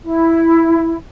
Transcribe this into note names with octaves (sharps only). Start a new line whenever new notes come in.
E4